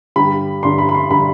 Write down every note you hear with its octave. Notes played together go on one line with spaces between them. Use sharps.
G2 D3 G3 B5
G2 D3 G3 C6
B5
B5
C6
D3 G3 B5